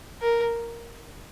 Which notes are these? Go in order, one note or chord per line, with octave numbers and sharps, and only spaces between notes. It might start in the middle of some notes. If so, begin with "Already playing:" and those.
A#4